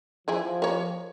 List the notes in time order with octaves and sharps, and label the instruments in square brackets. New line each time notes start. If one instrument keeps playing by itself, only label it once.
[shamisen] E3 E4 G#4 [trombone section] F3
[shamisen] A#4 C#5